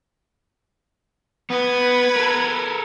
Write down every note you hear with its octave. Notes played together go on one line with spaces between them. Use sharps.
B3 B4 G#6
A4 A#4